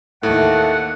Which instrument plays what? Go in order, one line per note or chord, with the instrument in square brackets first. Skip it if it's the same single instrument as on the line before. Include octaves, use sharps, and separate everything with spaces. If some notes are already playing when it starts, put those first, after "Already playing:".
[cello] D#2 [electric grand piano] A2 [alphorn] A3 [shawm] F#5